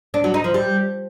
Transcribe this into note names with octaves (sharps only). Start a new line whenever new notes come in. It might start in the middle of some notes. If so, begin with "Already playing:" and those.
D4
F#3
D#4
F3
G3